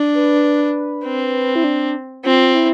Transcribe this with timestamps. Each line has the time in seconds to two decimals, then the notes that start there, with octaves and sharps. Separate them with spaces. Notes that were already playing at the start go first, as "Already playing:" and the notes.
Already playing: D4
0.14 B4
1.04 C4
1.56 E4
1.64 D4
2.24 C4 F4
2.54 E4